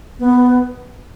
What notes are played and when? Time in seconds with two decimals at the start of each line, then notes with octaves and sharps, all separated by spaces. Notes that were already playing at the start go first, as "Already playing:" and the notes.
0.19 B3